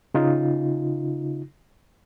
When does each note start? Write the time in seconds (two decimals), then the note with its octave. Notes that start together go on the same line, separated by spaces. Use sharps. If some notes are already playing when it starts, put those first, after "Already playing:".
0.14 C#3 D#4 F4